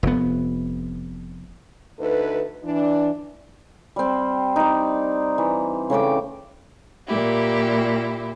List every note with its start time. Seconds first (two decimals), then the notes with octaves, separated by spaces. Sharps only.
0.03 F1 B3
1.99 D2 D#4 A4 B4
2.64 E3 D4
3.96 G3 C4
4.56 D#4 D5
5.38 E3
5.90 C#3 A3 G5 D6
7.07 A#2 E4 G4